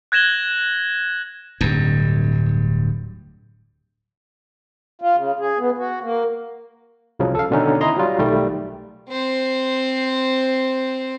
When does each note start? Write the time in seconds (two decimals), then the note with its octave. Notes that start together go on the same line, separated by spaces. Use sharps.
0.12 F#6 G#6 A#6 E7 F#7 G7
1.61 D1 G2
5.02 F4
5.16 C#3
5.39 G#4
5.59 B3
5.78 F#4
6.02 A#3
7.19 C2 C#3 F3 F#3
7.35 A4 F5
7.51 B2 D3 D#3 C#4 D#4
7.81 E4 D#5 A#5 C6
7.97 F#3 G3 F4
8.19 B1 D#3 G3 A3
9.09 C4 C5